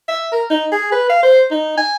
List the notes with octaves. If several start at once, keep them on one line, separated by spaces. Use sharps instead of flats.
E5
A#4
D#4
G#4
B4
F5
C5
D#4
G#5